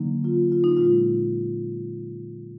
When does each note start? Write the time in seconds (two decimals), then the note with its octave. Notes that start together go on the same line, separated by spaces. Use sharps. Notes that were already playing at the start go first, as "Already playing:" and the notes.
Already playing: D3 F#3 A#3 D#4
0.24 F4
0.52 F4
0.64 D#4
0.77 A#2 G#3 F4